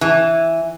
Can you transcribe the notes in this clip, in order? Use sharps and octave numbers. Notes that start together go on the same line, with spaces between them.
E3